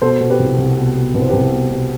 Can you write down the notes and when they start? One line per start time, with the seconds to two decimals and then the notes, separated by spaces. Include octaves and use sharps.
0.02 B2 A4 C5
0.21 B2
0.30 G4 B4
0.40 C2
0.58 C2
0.77 B2
0.97 B2
1.14 C2 B4
1.22 C5
1.29 C2 G4 B4
1.52 B2
1.71 B2